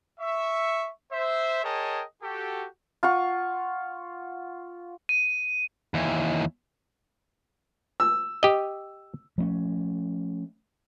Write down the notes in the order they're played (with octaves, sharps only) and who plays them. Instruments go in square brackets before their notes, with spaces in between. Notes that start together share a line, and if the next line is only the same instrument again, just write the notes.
[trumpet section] E5 C#6
C5 E5
G#4 A#4 C#5 D#5 G5 A5
F#4 G4 A4
[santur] F4 F#5 C#6
[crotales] D#7
[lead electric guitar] D#2 E3
[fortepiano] E6
[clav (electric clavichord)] G4 D#5
[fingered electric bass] F3 A3 C4 C#4